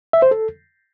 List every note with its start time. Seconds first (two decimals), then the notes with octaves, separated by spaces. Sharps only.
0.13 E5
0.22 C5
0.31 A4